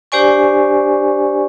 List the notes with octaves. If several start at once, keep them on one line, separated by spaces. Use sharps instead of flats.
D4 G4 C5 D5 G#5 C#6